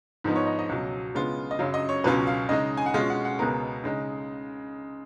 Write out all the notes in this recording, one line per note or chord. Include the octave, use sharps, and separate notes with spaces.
G#2 F3 B3 D#4
C#5
D#5
D#5
C#2 B2 F#3
C#3 G#3 B3 F4
D#5
F#2 C#3 F#3 F5
D#5
C#5
C#2 B2 F#3 C#4 F4 B4
F5
C#3 G#3 D#4 D#5
G#5
F#5
B2 G#3 C#4 F4 F5
F#5
F#5
C#2 B2 G#3 B3 A#4
C#3 G#3 D#4